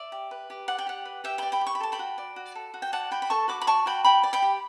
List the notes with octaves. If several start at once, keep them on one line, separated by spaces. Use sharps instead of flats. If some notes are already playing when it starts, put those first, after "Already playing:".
Already playing: D5 E5
G4
B4
G4
D5 F#5
G5
G4 F#5
B4
G4 E5 G5
D5 G5 B5
G5 B5
G4
C#6
B5
A4 A5
G5 B5
F#4
D5
F#4
A4
F#4
G5
D5 F#5 A5
F#4 G5 B5
B5
A4 A5 C#6
F#4 B5 D6
B5
D5 A5 C#6
F#4 G5 B5
D5 G5 B5
D5
G5 B5
G4